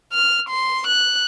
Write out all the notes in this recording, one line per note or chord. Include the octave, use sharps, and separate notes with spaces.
F6
C6
F#6